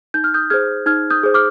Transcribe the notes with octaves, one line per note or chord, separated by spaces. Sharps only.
D#4 G6
F6
D#6 G6
G#4 C5 F6 G#6
D#4 F6 G#6
D#6 G6
G#4 C5
D6 F6